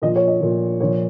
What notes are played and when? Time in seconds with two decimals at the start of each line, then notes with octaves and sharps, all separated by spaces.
0.02 A#2 F3 D#5
0.16 C#5
0.27 D#5
0.41 A#2 F3
0.80 A#2 F3 C#5